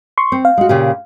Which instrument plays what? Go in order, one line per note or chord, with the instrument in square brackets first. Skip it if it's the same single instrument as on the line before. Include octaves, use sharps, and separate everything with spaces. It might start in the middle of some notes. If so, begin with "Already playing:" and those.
[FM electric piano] C6 C#6
[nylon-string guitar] C4
[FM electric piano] F5
[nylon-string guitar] G#3 F#4
A#2 C#3 G4